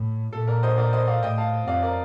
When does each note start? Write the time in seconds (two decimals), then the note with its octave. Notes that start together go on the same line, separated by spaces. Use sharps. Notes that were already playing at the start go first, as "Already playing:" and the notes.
Already playing: A2
0.33 A#2 A4
0.47 A#4 D5
0.63 C5 D#5
0.78 A#4 D5
0.93 C5 D#5
1.07 D5 F5
1.23 A2 D#5 G5
1.38 F5 A5
1.67 F2 D5 F5
1.82 A#4 D5